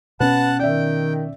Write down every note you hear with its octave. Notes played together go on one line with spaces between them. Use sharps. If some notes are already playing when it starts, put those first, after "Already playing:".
B2 B3 C#4 B4 F#5 A5 F#6
D#3 D5 E5 G5